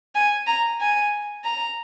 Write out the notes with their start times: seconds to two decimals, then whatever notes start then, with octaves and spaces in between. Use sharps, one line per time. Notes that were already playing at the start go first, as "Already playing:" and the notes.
0.15 G#5
0.47 A#5
0.80 G#5
1.45 A#5